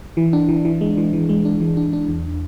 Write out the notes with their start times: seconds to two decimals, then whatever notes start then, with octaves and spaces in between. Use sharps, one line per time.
0.17 E3
0.33 D4
0.48 E3
0.65 E3
0.81 G#3
0.97 E3
1.13 E3
1.29 G#3
1.45 D4
1.61 E3
1.77 D4
1.93 D4
2.09 E2